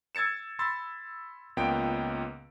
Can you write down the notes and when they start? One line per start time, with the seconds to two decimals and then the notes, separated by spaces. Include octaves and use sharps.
0.15 E6 G#6 A6 C#7 E7
0.59 B5 C6 E6 A6
1.57 C#2 A#2 B3 G5 D7